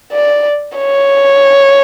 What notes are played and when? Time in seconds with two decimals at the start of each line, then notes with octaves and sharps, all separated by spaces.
0.13 D5
0.77 C#5